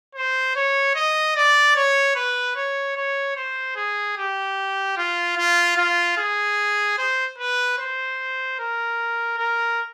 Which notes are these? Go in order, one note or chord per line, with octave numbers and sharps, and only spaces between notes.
C5
C#5
D#5
D5
C#5
B4
C#5
C#5
C5
G#4
G4
F4
F4
F4
G#4
C5
B4
C5
A#4
A#4